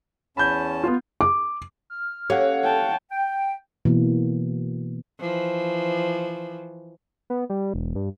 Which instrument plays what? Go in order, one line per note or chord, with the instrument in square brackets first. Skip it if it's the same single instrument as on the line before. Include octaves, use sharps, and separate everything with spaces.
[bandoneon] E2 C#4 A5 [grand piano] B5 G6
[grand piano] B3 F4
[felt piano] D6
[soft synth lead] F6
[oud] A#3 C#4 G4 [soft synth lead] A4 [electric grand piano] C#5 F5 F#5
[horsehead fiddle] G5 A5
[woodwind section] G5
[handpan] B2 E3 A#3
[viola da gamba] E3 F3
[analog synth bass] B3
G3
E1
G2